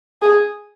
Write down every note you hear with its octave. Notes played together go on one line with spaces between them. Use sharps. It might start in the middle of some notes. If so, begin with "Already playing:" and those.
G#4